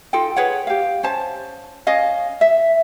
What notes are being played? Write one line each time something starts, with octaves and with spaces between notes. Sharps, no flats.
D#4 F4 A4 G5
G#4 B4 C#5 F#5
G4 F5
C#4 C5 A5
C#4 D#5 F5
E5